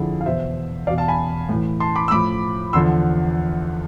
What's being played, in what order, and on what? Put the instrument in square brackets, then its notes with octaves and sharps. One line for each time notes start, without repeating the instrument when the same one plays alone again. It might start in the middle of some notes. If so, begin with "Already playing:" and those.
Already playing: [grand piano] F2 D3 F3 E4 G#4
F5
E2 B2 C5 E5
E2 B2 D5 F5
F5 A5
G#5 B5
A2 E3
A5 C6
B5 D6
E6
A2 F3 B5 D6
E2 D3 F3 C6 E6